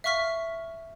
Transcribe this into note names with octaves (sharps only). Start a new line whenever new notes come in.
E5 F5 C#6 F6 B6